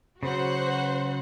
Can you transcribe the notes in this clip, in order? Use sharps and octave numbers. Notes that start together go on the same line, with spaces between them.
C#3 F#3 F#4 C5 F#5